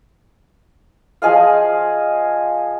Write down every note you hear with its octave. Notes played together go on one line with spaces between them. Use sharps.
F3 G#4 D#5 F5